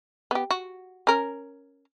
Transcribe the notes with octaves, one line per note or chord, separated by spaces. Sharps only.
B3 G4
F#4
C#4 A#4